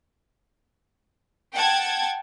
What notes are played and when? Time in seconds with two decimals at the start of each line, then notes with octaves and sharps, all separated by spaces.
1.55 F#5 G5 A5 G#6